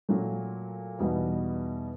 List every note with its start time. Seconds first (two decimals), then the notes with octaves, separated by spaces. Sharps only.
0.09 A#2 F#3 A3
0.99 E2 B2 G3 B3 D#4